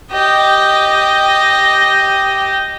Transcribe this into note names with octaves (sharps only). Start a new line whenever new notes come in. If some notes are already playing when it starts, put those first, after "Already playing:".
G4 D#5